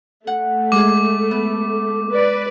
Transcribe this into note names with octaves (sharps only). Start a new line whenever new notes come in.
A3 F#5
G#3 G#4 D6
B3
B4 D5